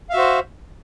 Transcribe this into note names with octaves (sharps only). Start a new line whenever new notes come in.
F#4 C5 E5 F5